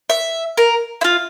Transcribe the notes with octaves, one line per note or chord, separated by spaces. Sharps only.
E5
A#4
E4
F4